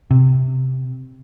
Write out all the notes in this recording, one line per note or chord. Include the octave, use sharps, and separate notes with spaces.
C3